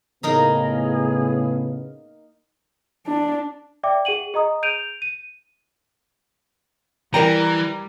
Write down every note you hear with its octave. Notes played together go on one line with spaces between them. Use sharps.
A2 C#3 A#3 B3 D#4 G#4 A#4
D4
D5 E5 G5 D6
G#4 F#5 D#7 F#7
G#4 D#5 A#5 D#6
G6 D7 D#7 F7
D#7
E3 G3 A#4 D5 G5 A#5